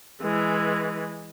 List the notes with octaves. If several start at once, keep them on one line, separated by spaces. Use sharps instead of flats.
E3 G#3